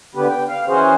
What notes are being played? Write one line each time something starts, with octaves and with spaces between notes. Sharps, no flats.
D3 B3 G4 B4
G5
F5
E3 C#4 F#4 G#4 C5